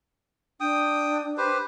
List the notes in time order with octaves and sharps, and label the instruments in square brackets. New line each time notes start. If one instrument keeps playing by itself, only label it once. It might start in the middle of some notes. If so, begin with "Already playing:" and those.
[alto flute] D4 [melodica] G5 D#6
[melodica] G4 B4 C5